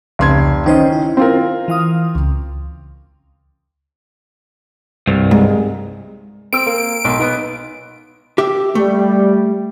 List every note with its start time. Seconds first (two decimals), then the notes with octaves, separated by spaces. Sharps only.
0.19 F1 C#2 C#3 C6 G#6
0.66 D#3 C#4 D#4 C5 D#5
0.92 E4
1.17 C4 F4 A#4
1.68 E3 F5 D#6
2.15 C#2
5.07 C2 G2
5.31 G#2
6.53 C4 E6 D7
6.66 A#3
7.05 B1 C6
7.19 B3 D#4
8.38 G4 E5
8.75 G3 A3